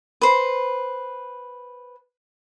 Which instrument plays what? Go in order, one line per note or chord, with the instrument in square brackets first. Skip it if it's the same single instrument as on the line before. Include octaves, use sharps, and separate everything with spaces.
[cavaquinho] B4 C5